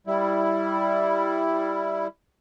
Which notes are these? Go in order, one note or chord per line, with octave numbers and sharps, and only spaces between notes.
G3 E4